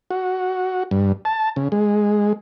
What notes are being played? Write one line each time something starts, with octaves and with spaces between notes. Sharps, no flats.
F#4
G2
A5
C#3
G#3